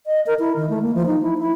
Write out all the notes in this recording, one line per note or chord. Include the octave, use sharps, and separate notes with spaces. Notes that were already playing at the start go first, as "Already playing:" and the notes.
D#5
A#4
E4
D#3
A3
A#3
F3
D#4
E4
E4